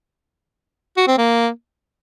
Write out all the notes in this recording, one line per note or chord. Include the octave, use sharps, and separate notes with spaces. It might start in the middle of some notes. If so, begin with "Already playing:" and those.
F#4
C4
A#3